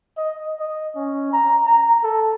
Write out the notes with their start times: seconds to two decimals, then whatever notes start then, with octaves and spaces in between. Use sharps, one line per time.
0.18 D#5
0.60 D#5
0.95 C#4
1.33 A#5
1.66 A#5
2.04 A4